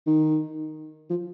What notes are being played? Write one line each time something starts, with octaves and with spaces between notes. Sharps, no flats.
D#3
F3